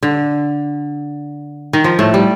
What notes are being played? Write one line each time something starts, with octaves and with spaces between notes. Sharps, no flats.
D3
D#3
F3
A2 A3
G3